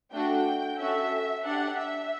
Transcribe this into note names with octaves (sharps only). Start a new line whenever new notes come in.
A3 D4 F#4 A4 G5
C#4 F#4 A4 E5
D4 G4 F#5
E5